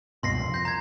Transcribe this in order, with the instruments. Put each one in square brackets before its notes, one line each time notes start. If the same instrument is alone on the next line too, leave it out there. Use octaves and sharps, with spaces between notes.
[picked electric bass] C#2 G2 B2 [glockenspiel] C6 A#6 C7
[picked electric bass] C2 F2
[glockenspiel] G6 A#6
A#5 G#6